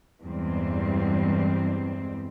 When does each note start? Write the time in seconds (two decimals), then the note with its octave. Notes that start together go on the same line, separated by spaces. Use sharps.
0.21 E2 G2 G3 G#3 C4